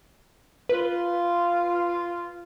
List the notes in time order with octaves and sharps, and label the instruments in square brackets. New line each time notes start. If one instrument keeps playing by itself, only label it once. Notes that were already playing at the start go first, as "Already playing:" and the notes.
[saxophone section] F4 [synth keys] B4